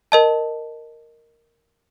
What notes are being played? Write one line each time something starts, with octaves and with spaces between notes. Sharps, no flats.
A#4 D#5 A5